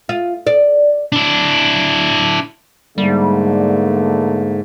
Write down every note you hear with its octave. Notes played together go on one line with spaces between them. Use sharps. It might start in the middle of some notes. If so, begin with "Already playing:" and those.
F4
D5
D4 E4
G#2 D3 G3 A3 A#3